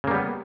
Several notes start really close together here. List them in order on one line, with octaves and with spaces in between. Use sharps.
C#3 A#3 G3 B3